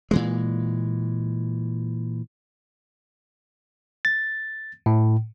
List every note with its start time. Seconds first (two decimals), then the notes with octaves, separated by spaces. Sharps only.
0.11 A#2 E3 G#3
4.05 A6
4.86 A2